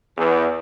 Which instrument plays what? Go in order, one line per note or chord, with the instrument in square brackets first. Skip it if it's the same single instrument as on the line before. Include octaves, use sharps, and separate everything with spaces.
[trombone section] E2